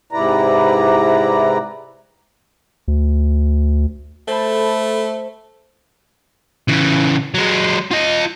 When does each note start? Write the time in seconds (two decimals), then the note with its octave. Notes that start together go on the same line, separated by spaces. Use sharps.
0.12 G#2 C3 E4 B4 D5 A#5
2.88 D2
4.28 A3 A4 C5 A5 B5
6.68 C#3 E3
7.34 F#3 G#3
7.91 F4 D#5